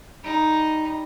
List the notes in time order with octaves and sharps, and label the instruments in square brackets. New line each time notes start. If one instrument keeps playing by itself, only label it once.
[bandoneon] G3 [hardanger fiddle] D#4